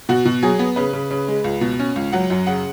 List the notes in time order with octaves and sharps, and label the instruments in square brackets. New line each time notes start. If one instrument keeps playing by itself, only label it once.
[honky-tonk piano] B2 F#4
B2
F#3 G#4
B3
C#3 B4
C#3
C#3
G#3
C#2
B2
C#4
C#2
F#3 F#5
F#2
C#3 F#5